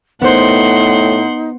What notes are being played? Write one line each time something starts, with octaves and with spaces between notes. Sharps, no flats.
A2 B3 D#4 C5 F#5 C6